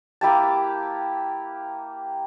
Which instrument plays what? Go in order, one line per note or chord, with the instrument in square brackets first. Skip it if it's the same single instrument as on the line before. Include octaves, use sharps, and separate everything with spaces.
[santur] A#3 E4 G4 A5